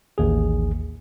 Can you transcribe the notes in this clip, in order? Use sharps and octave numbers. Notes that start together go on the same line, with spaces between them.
A1 D#2 G#4